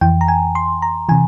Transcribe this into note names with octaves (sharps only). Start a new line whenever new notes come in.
F2 E3 G5
A#5
G#5
C6
A#5
C3 E3 G#5